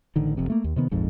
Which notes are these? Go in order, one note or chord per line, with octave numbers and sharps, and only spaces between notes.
A1 D3 D#3
F1 F2 C3
A3 A#3
D#2
C3 D#3 B3
F1 A#1 F2 G#2